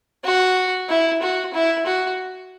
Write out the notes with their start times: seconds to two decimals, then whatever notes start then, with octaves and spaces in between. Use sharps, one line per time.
0.25 F#4
0.89 E4
1.22 F#4
1.54 E4
1.87 F#4